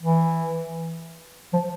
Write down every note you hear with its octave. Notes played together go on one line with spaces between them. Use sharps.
E3
F3